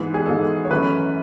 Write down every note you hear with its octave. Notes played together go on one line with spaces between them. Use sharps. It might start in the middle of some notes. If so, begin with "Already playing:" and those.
Already playing: G#2 E3 G#3 B3
G#4
G#2 E3 G#3 B3 A4
C#5
F#2 E3 A3 C#4 B4